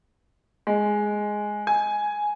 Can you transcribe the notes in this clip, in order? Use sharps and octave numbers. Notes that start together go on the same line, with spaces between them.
G#3
G#5